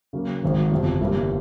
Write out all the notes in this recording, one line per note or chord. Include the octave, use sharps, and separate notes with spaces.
C#3 F#3 A#3
G#1 G#2 D#3
G1 F2 C3 F3
G1 G2 E3 G3 A#3